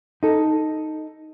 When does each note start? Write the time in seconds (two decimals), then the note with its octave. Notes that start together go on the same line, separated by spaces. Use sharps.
0.23 D#4 A4